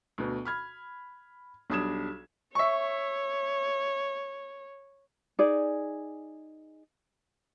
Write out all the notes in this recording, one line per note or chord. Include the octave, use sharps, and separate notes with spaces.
D2 B2
B5 F6 G#6
B1 G3 D4 D#6 G#6 E7
C#5 E5 C#6
D#4 G#4 D5